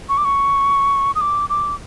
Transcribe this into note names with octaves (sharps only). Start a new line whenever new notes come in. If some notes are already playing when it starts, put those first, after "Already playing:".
C#6
D6
C#6
D#6
D6
D6